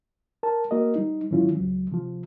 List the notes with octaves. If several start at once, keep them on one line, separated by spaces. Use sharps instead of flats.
A#4 A5
A#3 F#4 A#4 D#5
G3 D#4
G#2 D#3 F#3 C#4 E4 F4
C#2 F#3
C3 F3